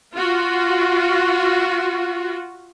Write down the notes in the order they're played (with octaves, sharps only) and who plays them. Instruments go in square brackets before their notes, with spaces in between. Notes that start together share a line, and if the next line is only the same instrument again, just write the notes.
[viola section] F4 F#4